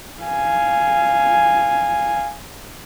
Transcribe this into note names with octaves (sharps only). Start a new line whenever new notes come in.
F5 G#5